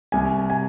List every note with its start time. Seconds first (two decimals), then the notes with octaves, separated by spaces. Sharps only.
0.12 C2 G#5
0.50 G#5